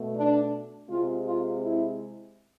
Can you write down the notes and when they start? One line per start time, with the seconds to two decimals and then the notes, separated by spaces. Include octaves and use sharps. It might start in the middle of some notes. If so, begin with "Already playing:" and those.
Already playing: B2 A3
0.15 D4
0.89 C3 G#3 C4 F4
1.26 F4
1.62 E4